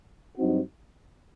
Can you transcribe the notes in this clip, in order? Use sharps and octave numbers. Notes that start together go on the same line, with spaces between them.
G2 F#3 C4 D#4 F#4